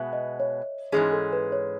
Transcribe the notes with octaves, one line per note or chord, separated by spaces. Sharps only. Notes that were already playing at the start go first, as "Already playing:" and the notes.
Already playing: B2 G#3 B3 E5
D#5
C#5
G#2 E3 G#3 C#4 G#4
A4
B4
C#5